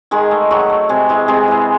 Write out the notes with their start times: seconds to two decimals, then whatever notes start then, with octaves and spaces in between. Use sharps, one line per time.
0.11 D#3 G#3 G#4
0.31 A3
0.50 D#3 F#3 F#4
0.70 A3
0.89 C3 G#3 G#4
1.09 E3 G#3
1.28 C3 G#3 G#4
1.48 E3 G#3